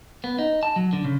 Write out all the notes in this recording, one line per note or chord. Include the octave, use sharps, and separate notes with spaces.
B3
D#4
A5
F#3
D3
C#3